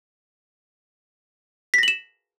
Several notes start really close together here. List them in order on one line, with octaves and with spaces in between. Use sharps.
B6 A#6 F#7 E7